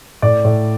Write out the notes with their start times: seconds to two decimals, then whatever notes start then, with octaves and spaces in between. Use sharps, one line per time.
0.22 A2 D5
0.45 A2